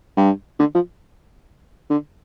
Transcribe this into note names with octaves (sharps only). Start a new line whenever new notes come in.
G2
D3
F3
D3